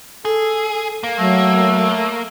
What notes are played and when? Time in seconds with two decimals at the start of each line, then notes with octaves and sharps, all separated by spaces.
0.25 G#4 A4
1.03 A#3
1.19 F#3 A3